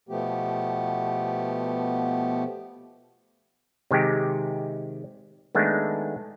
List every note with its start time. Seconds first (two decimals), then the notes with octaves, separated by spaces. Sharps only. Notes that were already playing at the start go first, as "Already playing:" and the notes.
0.09 B2 F3 A3 B3 G4
3.91 C3 D#3 G#3 G4
5.55 D#3 G#3 A3 B3 D4